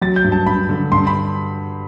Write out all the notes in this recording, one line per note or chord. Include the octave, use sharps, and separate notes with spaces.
F#3 A6
G6
G2
A5
G2 B5
D3
G2 C6
B5